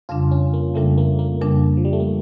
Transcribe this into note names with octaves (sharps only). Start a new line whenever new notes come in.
F2 C#3 G3 D4 F4
C#4
A#3
F2 C#3 G3 A3 D4
A#3
A#3
F2 C#3 G3 A#3 D4
F3
G3
A3
A#3